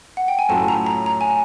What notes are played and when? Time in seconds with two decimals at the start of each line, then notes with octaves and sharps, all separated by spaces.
0.17 F#5
0.28 G5
0.39 G#5
0.49 A2 F#3 A3 C#4 F4 A5
0.68 A#5
0.86 A#5
1.06 A#5
1.21 G#5